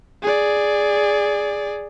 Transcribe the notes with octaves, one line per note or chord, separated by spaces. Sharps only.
G#4 D5